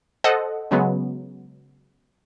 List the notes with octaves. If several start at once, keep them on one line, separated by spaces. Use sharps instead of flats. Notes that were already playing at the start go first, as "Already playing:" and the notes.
A4 C5 D#5 F#5
C#3 F#3 G#3 B3